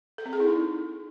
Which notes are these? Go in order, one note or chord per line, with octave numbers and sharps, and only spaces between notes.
A4
C4
G#4
E4
D#4